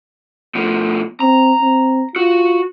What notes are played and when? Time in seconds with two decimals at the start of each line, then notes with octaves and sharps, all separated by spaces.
0.55 B2 F3 A3
1.20 C4 A#5
1.62 C4
2.16 F4 F#4